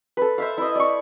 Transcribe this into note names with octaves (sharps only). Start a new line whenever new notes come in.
A4 B4
C5 E5 F5
E4 D#5
D5 C#6